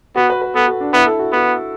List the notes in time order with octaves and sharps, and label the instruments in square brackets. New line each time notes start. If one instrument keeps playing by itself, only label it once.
[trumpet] B3 [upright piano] F#4
[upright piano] B4
B4
[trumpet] B3 [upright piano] A4
[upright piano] F#4
D4
[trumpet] B3 [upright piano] E4
[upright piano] A4
F#4
[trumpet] B3 [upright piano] F#4